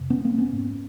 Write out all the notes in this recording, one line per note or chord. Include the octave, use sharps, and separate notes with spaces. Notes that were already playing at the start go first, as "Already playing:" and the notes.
Already playing: F2 C3
B3 C#4
A#3 C4
B3 C#4
G#2